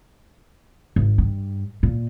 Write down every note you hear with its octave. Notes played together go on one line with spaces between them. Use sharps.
G#1
G2
A#2